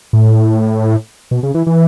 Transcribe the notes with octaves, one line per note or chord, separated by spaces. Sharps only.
A2
B2
C#3
E3
E3